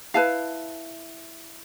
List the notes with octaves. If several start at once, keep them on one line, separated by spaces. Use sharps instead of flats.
E4 B4 F5 A5